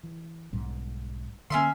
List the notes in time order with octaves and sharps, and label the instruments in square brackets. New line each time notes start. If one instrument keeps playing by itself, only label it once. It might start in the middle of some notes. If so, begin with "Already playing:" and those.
[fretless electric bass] E3
B1 G#2 G3
[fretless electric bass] D3 A#3 [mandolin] C#4 E5 C6